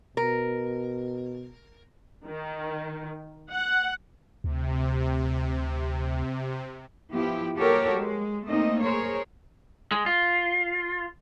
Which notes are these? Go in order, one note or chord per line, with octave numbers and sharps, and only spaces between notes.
B2 A#4
D#3
F#5
D2 C3
F3 B3 E4 G4
A#3 F#4 G4 A4 A#4 C#5
G#3
A3 A#3 C4 D#4 D#5
G#4 A#4 C5 C#5
G#3
F4